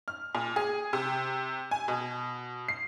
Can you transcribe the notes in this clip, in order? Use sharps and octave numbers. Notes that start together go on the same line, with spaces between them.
F6
A#2
G#4
C3
G#5
B2
C7